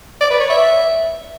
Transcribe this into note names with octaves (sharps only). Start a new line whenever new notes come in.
D5
B4
C#5
E5